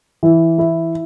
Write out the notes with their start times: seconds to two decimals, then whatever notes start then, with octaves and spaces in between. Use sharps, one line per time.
0.23 E3
0.58 E4